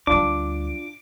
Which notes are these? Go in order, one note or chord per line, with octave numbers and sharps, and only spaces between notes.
D2 G3 D4 F4 D6